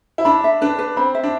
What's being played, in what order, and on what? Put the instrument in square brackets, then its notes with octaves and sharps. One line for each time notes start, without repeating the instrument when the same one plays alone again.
[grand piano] E4
[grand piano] D4 [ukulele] B5
[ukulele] E5
[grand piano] D4 [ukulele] B4
[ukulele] B4
[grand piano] C4 [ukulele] B5
[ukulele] E5
[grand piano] D4